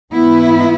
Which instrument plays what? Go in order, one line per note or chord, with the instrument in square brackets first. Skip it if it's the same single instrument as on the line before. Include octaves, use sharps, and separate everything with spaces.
[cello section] G#2 E3 B3 E4